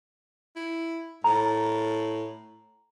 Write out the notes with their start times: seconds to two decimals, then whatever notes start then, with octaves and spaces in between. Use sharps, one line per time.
0.56 E4
1.24 A2 A#5